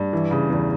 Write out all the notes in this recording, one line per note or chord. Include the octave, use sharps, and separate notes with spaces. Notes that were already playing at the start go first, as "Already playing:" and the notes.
Already playing: G2
E3
C#3
E2